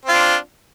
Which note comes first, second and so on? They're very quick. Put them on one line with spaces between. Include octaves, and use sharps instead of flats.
C4 F4 D4